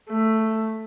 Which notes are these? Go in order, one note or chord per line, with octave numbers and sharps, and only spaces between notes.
A3